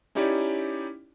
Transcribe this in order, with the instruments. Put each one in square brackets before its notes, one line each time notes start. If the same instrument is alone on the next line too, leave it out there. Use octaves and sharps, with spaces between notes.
[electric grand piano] C#4 D#4 E4 G4 C#5 D5